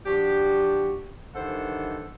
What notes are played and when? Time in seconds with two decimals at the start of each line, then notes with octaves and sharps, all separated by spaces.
0.06 F3 D4 F#4 G4
1.35 G2 D#3 E3 A4 C5 F#5